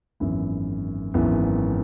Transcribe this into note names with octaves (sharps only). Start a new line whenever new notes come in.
G#1 F#2 E3 B3 E4
G#1 F#2 E3 B3 E4